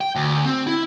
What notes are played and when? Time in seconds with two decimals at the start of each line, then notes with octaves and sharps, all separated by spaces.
0.01 G5
0.15 D2
0.45 C4
0.67 E4